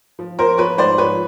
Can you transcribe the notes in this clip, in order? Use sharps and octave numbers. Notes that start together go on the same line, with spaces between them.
F3
F3 A#4 C5
F3 B4 C#5
G#2 C5 D5
F3 B4 C#5